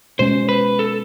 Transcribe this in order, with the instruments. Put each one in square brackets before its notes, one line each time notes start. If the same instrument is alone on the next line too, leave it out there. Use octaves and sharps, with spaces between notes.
[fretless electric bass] B2 G#3 C#4 [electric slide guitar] C5
[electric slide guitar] B4
A4